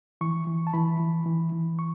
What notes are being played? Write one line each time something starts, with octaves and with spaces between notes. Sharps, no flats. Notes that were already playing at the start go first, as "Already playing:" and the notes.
E3 C#6
E3
A5
E3 B5
E3
E3
E3
C#6